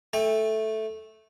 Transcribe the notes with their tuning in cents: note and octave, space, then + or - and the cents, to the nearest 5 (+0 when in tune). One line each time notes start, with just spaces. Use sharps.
A3 -5 G5 +35